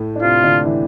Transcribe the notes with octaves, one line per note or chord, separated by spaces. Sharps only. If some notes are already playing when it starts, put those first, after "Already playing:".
Already playing: A2 A3
D4
C3 C4 F4
D3 D4
E3 E4